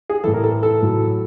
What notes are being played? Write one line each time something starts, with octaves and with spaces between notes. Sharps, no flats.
G#4
A2 E3 A4
A#4
A4
A4
A2 F#3